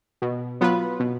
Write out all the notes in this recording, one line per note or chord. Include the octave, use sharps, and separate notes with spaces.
B2
F#3 B3 F4 B4
B2